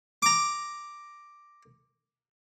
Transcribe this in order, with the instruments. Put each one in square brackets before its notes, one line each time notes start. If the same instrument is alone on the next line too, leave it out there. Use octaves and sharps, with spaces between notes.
[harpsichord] A#5 D6